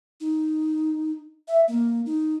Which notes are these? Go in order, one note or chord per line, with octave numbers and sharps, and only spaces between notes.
D#4
E5
A#3
D#4